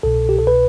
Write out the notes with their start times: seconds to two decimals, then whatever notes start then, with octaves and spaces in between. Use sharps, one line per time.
0.03 C2 B2 A4
0.29 G4
0.39 A4
0.47 B4